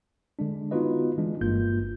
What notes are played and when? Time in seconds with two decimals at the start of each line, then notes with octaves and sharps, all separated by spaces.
0.39 D3 G#3 D4
0.71 B3 D#4 F4 F#4 B4 D#5
1.18 E3 G#3 D4
1.41 G1 G2 A#3 F4 G6